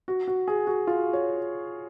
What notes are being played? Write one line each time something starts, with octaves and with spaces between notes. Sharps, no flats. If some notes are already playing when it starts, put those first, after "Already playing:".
F#4
F#4
G#4
F#4
F4
C#5